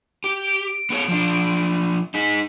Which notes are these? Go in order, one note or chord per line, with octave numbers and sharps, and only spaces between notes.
G4 D7
D7
B3 G#4 C#5
F3 D4
D#4 G#4 B6